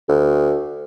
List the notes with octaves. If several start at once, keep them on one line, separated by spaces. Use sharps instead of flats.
D2